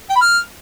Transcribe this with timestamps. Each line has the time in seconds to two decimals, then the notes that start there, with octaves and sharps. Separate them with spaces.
0.10 G5
0.16 B5
0.21 F6